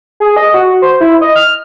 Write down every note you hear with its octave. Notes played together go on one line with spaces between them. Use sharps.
G#4
D#5
F#4
C5
E4
D#5
F6